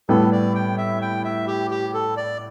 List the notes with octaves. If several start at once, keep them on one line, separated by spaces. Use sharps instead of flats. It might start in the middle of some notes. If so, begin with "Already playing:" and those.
A2 G3 B3 A4
D5
G5
E5
G5
E5
G4
G4
A4
D5